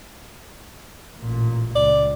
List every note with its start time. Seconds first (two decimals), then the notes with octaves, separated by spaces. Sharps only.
1.20 A1 A#2
1.76 C#2 D5